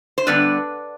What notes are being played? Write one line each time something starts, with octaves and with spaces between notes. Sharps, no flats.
C5
G2 D3 G3 B3 D4 B4 D5